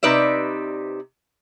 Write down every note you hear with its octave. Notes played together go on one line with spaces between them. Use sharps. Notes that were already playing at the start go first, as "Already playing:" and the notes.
C3 D#4 B4 D5 E5